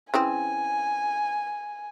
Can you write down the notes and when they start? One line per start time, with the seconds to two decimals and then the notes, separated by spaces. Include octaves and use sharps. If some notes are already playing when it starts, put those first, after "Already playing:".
0.14 C#3 E3 C4 G#5